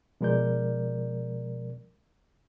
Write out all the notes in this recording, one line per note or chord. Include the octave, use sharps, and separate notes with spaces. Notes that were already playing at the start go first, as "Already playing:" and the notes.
B2 F3 G#3 A#4 D5 G6